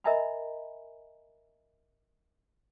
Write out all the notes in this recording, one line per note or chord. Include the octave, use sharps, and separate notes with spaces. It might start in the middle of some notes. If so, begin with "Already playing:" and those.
A#4 D#5 E5 G#5 A#5 B5